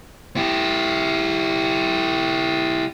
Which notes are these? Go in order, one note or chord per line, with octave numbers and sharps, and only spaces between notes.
E4 G4